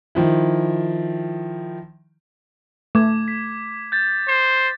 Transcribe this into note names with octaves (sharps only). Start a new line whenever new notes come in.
D#3 F3 E4
A3 D6 G#6
B6
G6 A6
C5